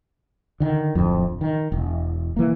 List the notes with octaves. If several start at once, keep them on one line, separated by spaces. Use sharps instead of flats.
D3 D#3
D1 F2
D#3
E1
E3 A#3